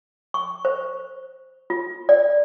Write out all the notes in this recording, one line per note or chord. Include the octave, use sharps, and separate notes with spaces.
C#6
C5
F4
D5